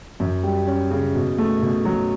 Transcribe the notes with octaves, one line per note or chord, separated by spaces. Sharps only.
F#2
G3
C#4
C#3
B2
A3
B2
F#3